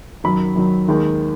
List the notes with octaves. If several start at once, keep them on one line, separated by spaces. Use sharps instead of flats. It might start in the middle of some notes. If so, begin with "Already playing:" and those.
F#2 D#3 F#3 B5
F#2 D#3 F#3
D#2 D#3 G#3